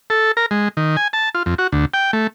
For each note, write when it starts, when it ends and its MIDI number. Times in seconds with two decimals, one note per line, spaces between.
0.10 0.32 69
0.37 0.46 70
0.51 0.69 56
0.77 0.97 51
0.97 1.08 80
1.13 1.29 81
1.35 1.43 65
1.46 1.55 41
1.58 1.67 66
1.72 1.85 38
1.94 2.11 79
2.13 2.27 57